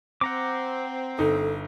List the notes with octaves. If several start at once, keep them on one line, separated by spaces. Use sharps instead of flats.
C4 F#5 A#5 D6
G1 D#4 A4